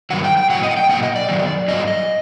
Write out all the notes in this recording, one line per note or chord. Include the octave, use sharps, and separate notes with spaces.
G2 D#3 F#3 F#5
G5
G5
A2 F#3 F#5
D#5
F#5
G5
A#2 F#3 F#5
D#5
D5
F#2 D#3 F#3
G2 F#3 D#5
D#5